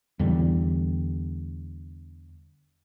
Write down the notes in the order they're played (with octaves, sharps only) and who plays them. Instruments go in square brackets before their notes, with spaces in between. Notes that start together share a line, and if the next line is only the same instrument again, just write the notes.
[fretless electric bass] E2 D3 G3